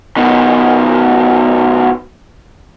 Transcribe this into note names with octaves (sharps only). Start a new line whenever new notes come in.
B2 D#3